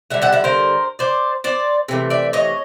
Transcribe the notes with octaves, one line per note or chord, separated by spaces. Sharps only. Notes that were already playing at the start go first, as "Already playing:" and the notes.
D3 G3 E5 F#5
E5 F#5
E5 F#5
A#4 C5
C5 D5
C5 D5
C3 E3 A3
D5 E5
C#5 D#5